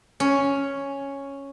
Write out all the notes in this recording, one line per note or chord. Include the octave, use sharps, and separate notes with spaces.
C#4